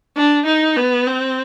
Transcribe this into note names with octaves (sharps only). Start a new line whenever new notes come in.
D4
D#4
B3
C4